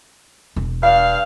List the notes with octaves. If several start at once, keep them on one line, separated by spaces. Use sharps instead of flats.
E1
G2 D4 F5